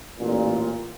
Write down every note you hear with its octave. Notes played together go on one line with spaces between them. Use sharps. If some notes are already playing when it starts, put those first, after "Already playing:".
A1 A#2